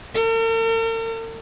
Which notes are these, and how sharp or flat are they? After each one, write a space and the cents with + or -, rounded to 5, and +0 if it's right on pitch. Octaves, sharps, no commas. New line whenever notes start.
A#4 -45